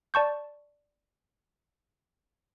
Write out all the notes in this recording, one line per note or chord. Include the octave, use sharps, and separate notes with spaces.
D5 A5 C#6 G6